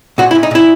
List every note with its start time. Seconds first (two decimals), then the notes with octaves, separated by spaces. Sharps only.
0.18 A#2 F#4
0.31 E4
0.35 A#2
0.43 D#4
0.51 A#2 E4